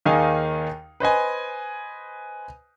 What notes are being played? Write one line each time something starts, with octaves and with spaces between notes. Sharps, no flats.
D#2 D#3 D#4 G#4 F5 G#5
B4 C5 D#5 G#5